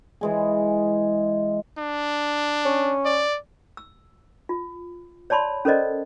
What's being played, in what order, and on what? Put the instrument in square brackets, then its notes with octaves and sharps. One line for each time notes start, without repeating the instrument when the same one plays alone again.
[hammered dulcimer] E3 G#3 G#4
[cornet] D4
[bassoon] C#4
[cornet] D5
[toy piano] E6
F4
C#5 D5 A5 B5 C6
C#4 A4 A#4 C5 D5 D#5